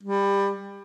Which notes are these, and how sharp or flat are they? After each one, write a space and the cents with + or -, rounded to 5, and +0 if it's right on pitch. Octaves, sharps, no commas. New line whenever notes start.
G3 +20